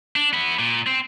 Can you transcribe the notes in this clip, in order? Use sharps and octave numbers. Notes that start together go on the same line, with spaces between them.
D4
B3 E4
A#2
C4